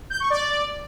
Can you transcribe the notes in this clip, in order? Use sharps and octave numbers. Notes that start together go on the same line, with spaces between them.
G6
C#6
D5